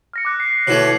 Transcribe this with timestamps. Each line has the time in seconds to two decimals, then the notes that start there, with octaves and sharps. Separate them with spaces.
0.13 F6 A#6 C#7
0.25 D6 F#6 A#6
0.40 C7
0.67 B2 E3 A3 C#5